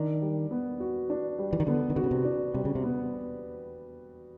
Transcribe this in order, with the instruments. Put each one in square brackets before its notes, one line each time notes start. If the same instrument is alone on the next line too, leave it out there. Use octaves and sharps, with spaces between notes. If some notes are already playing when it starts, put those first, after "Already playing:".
Already playing: [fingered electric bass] D#3 [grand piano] D4
[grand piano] G3
B3
F#4
D4
G3
[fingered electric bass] E3
D#3
[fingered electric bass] D3 [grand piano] B3
[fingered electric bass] D#3
[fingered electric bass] D3 [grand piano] F#4
[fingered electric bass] C#3
C3
[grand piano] D4
[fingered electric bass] C3 [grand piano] G3
[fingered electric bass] C#3
C3
[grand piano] B3